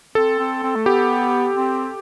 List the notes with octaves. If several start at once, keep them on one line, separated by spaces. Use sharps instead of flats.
C4 A4
C4
C4
A3
B3 G4
C4